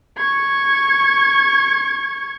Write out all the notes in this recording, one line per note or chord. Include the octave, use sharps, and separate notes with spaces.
C#6 G#6